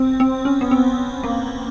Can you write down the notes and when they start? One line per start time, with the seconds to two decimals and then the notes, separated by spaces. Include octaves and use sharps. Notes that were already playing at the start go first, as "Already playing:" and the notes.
Already playing: C4
0.20 C4
0.45 C#4
0.61 B3
0.71 C4
1.23 A#3